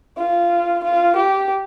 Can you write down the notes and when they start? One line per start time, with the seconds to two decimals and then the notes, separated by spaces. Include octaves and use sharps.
0.18 F4
0.84 F4
1.16 G4